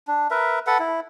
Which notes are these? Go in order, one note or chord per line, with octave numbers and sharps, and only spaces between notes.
D4
A#4 B4 E5
A4 B4 F#5
E4